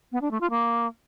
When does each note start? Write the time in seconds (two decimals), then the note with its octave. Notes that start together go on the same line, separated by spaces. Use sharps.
0.12 B3
0.22 D4
0.31 A3
0.41 F4
0.50 A#3